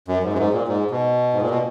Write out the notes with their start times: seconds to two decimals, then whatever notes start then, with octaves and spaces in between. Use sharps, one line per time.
0.08 F#2
0.23 G#2
0.33 F#2
0.39 G#2
0.53 A#2
0.68 G#2
0.91 B2
1.33 G#2
1.41 A#2
1.50 B2